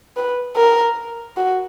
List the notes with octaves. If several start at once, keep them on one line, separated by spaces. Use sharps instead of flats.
B4
A#4
F#4